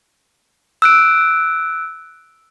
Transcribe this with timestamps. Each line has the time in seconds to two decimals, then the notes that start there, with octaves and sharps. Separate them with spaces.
0.82 E6 F#6 D7